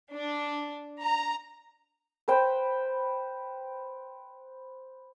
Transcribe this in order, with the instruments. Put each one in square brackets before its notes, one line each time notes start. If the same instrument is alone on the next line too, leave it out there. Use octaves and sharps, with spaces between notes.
[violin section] D4
A#5
[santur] B4 C5 G5